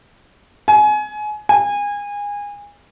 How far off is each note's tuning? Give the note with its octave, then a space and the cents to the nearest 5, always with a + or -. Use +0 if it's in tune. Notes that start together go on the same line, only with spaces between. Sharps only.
G#5 +25
G#5 -25